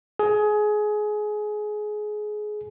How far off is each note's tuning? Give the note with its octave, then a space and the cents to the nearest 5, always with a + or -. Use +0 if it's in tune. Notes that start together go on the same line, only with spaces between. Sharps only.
G#4 +20